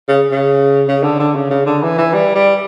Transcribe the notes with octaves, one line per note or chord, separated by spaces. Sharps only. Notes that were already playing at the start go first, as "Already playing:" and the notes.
C#3
C#3
C#3
D3
D3
C#3
C#3
D3
E3
E3
G3
G3